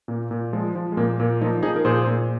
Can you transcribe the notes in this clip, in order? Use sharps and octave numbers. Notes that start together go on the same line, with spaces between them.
A#2 A#3
A#2
F3 G#3
F3
G#3
A#2 A#3
A#2 A#3
F3 A#3 D#4
F3 D#4 G#4
A#4
A#2 G#4 C5
A#2